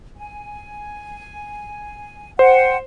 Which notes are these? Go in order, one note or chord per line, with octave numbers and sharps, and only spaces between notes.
G#5
C5 F#5 G5